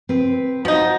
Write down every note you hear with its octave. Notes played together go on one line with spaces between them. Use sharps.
C4 B4
F3 D#4 F#4